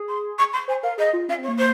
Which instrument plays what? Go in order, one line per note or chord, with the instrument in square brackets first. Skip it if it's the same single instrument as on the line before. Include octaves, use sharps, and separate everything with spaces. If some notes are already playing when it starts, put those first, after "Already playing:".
Already playing: [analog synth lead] G#4
[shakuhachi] C6
C#6
C6
[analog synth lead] C5 [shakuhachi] G#5
[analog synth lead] A#4 [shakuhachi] F5
[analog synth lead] G#4 [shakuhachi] D#5
[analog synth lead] F4
[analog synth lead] C#4 [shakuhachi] F5
[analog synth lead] C4
[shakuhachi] C#5
[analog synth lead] A#3
[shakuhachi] C5